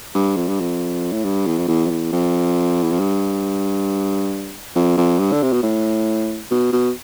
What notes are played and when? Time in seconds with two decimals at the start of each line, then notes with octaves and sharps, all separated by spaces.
0.14 G2
0.36 F2
0.48 G2
0.60 F2
1.12 A2
1.24 G2
1.46 E2
1.58 F2
1.68 E2
1.86 F2
1.90 E2
2.12 F2
2.82 E2
2.91 F2
3.00 G2
4.75 F2
4.97 F2
5.19 G2
5.32 D3
5.42 C3
5.53 B2
5.63 A2
6.51 B2
6.72 B2